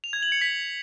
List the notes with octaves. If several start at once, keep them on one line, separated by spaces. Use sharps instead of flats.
F7
G#6
F#7
C#7
B6